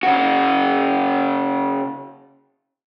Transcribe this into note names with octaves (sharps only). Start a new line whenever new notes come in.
C#3 F#4